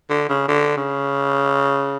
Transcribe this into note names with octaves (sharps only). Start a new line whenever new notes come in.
D3
C#3
D3
C#3